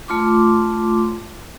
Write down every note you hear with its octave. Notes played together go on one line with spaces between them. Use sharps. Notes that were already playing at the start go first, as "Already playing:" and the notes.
A3 F4 C6 D6